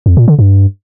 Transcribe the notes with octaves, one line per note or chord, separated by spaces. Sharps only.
F2
A#2
D3
G2